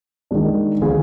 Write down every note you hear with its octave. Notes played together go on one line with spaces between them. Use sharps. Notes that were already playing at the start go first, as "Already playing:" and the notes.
D#3 G#3 D4
D3 F3 B3 F4 G#4